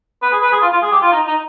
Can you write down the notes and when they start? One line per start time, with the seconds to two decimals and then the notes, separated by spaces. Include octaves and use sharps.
0.23 B4
0.32 G#4
0.42 B4
0.52 G#4
0.62 F4
0.72 F4
0.82 G#4
0.92 G4
1.02 F4
1.12 D#4
1.27 D#4